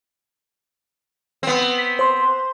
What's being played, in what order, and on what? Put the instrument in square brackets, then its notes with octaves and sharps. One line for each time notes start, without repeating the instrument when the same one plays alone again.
[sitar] B3 C4
[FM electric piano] B6
C5 C6